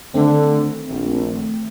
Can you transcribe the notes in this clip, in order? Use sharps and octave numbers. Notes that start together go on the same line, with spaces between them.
D3 D#3 A3 C4
A#1